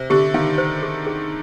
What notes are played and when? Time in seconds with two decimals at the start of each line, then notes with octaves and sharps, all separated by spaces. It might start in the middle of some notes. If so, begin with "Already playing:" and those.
Already playing: C3 C5
0.10 D3 G4
0.34 D#3 F5
0.58 C5
0.83 G#4
1.07 G#4